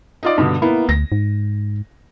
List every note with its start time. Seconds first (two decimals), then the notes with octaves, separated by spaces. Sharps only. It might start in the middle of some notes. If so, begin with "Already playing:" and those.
0.23 D#4 F4 D5
0.38 G2 B2 D3
0.62 A#3 B3 E4
0.89 D2 A#6
1.12 G#2